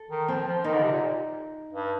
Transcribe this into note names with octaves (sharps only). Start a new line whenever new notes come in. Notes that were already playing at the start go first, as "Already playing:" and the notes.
Already playing: A4
D#3
F3 C4
F3
D#3 D#4
D3
C3
A#2
G2